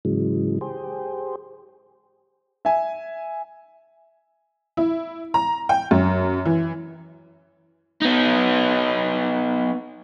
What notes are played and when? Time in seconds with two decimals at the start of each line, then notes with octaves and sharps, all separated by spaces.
0.05 G#2 C#3 E3 F#3 G#3
0.61 G4 G#4 C5
2.65 E5 G#5
4.77 E4
5.34 A#5
5.69 G5
5.91 F#2
6.45 E3
8.02 B3 D#4